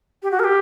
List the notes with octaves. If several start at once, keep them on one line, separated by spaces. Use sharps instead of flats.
G4
F#4
A#4
G4